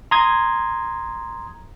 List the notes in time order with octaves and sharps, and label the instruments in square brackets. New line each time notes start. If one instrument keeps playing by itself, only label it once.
[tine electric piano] A#5 C6 D#6 G#6